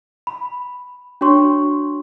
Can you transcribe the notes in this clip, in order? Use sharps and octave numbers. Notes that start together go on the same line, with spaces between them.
B5
D4 F#4 C#5 C6 C#6